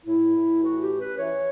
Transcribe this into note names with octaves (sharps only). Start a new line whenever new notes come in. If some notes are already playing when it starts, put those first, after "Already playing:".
A2 E4
A2
E3 F#4
G4
C#4
B4
E3 C#5